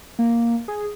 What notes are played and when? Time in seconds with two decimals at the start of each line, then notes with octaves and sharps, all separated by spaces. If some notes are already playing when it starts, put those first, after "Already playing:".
0.19 A#3
0.68 G#4